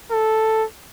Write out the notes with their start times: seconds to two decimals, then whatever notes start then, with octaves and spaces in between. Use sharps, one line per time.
0.12 A4